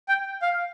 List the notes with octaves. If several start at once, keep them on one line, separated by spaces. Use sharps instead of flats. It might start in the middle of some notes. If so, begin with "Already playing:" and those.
G5
F5